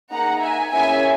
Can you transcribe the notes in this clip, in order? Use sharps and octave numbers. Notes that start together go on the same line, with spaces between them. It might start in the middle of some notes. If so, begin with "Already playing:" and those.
A#3 D#4 G#4 F#5 A#5
E5 G#5
A#3 C#4 E4 G#4 E5 G#5